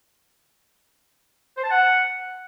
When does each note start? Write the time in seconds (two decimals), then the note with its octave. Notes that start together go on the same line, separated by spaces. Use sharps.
1.57 C5
1.64 A5
1.71 F#5